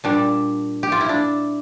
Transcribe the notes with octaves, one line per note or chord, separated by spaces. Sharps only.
A#2 G3 D4
G4
F4
E4
D4